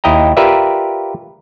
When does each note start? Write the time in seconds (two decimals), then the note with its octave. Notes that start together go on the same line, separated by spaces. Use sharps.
0.04 D#2 E4 D#5 G5 A#5
0.37 F4 G4 A#4 B4 D5 E5